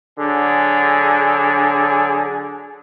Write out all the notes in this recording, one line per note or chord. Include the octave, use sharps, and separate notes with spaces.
D3 F#3 G#4